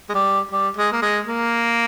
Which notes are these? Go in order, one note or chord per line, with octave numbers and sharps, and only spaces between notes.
G#3
G3
G3
G#3
A#3
G#3
A#3